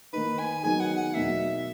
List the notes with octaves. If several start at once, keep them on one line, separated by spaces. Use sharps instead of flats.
D#3 A#3 D#4 B4
G#5
D#3 F#3 B3 D#4 G#4 G#5
F#5
F#5
E2 B2 F#3 A#3 D#4 E5